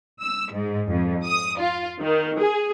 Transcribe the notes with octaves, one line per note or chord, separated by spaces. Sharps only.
E6
G#2
F2
D#6
F4
D#3
G#4